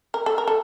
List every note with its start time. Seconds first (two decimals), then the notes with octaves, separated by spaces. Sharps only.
0.14 A#4
0.26 A4
0.38 A#4
0.47 A4